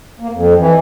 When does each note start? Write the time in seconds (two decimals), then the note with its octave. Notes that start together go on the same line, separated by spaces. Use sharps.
0.20 A#3
0.32 F2
0.58 E3